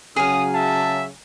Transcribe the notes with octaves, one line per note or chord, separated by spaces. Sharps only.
C#3 F#3 G#4 F5 D#6
E5 A5